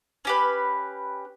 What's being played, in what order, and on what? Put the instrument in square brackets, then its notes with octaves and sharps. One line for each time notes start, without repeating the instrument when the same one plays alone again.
[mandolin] C#4 G4 B4